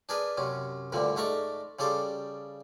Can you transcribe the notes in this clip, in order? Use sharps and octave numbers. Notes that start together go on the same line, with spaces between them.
D4 G#4 A#4 B4
F#2 C3 C#4
D2 G2 A#2 D3 G3
G#2 A3 A#4 D5 A#5 C#6
C#3 G3 G4 A4 C5